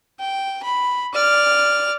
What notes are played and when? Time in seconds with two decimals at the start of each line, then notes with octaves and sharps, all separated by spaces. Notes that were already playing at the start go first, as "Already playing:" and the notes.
0.19 G5
0.63 B5
1.14 D5 F6